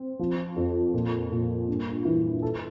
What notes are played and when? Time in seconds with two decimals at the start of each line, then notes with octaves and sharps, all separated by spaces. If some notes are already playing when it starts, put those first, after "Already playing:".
Already playing: C4
0.19 F3
0.56 F2
0.94 A#2
1.31 A#2
1.68 G2
2.05 E3
2.42 A4